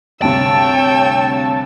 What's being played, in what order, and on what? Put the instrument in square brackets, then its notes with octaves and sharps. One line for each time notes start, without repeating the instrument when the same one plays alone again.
[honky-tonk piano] D2 G2 C3 [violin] C#5 E6 [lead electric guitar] G5 [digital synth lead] A5